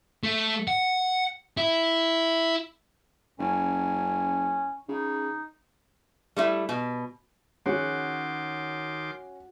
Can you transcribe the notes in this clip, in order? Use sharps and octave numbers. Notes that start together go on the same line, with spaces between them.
A3
F#5
E4
F#1 C#4
C#3 D#4
G3 A3 E4
B2
D#3 C#4 F#4 C6 D6